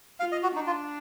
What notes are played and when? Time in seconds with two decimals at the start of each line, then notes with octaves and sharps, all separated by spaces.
0.20 F4 F5
0.32 D#5
0.43 F#4
0.55 D4 D#4
0.67 F4